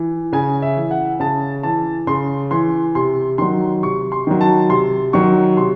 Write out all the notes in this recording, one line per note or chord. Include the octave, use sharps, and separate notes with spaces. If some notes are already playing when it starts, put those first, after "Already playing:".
Already playing: E3
C#3 G#5
E5
E3
F#5
C#3 A5
E3 A5
C#3 C6
E3 C6
C3 C6
D#3 F#3 C6
C3 C#6
C6
D#3 F#3
A5
C3 C6
D#3 F#3 C#6
C3 C6